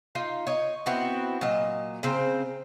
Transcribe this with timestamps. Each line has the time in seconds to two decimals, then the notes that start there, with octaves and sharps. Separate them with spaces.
0.15 D#4 F4 F5
0.47 C#5 D#5
0.86 B3 C4 E4 F#4
1.41 A#2 F#3 D#5
2.03 C#3 C4 C5 A#5